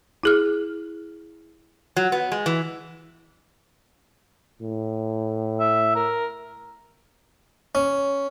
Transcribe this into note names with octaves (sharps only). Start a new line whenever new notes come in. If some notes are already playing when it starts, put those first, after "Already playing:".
E4 G#4 F6
F#3
B3
G#3
E3
A2
E5
A#4
C#4